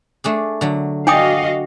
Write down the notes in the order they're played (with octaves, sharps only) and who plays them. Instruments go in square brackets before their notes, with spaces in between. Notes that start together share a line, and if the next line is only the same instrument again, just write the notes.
[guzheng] A3 D4 G#4
D3 F#3
[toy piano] D4 G5 D#6 [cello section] F#4 D#5 F5 [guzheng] D5